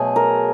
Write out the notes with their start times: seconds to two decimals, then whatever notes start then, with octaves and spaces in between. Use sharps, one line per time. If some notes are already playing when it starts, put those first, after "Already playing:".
Already playing: B2 F#3 A3 G#4
0.16 A#4